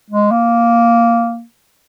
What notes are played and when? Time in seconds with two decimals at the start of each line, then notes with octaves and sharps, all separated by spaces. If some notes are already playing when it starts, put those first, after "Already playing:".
0.10 G#3
0.31 A#3